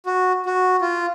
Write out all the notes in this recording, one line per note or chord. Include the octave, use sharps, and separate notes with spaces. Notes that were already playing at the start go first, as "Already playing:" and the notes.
F#4
F#4
F4